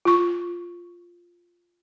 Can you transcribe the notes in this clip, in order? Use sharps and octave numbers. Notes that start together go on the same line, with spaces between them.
F4 C#6